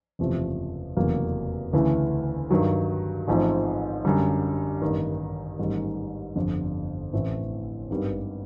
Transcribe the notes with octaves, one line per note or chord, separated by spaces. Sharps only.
F#1 E2 C3 F3 A3
F1 E2 C#3 F#3 A#3
D2 C#3 E3 A3
G2 D#3 F#3
A1 G#2 F3 A3 C4
F#2 D3 G3
A1 G2 D#3
A1 G#2 D#3 G3
G1 F2 D3
A1 A2 E3 A3 C4
G#1 G2 D#3 G3 B3